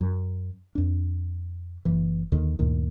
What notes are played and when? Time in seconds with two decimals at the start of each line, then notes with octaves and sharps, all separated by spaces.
0.01 F#2
0.75 F2 D4
1.85 F#1 E3
2.32 D#2 D3 D#3
2.59 D2 G2 A#2 D#3